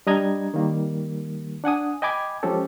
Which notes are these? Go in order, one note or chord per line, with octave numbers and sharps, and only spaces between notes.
G3 D4 D#5 A#5 G#6
D#3 G3 A#3
D4 F#5 G#5 D#6
D#5 G5 G#5 B5 D6 G#6
F3 G#3 C#4 G4 A4